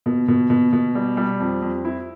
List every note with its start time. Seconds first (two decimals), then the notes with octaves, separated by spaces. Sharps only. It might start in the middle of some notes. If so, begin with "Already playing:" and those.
0.06 B2
0.28 B2
0.50 B2
0.73 B2
0.95 G3
1.17 G3
1.40 F2
1.62 F2
1.85 E4